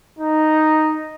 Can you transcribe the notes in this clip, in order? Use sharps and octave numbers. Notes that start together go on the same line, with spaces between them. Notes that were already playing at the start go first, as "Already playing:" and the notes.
D#4